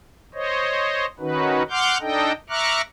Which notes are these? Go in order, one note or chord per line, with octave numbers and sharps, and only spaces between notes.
C5 C#5 D#5
D#3 C#4 D#4 F#4 B4
F#5 C6 D6 F6 G6
D4 D#4 A4 D#5 G5
E5 A#5 C#6 D6 F6 F#6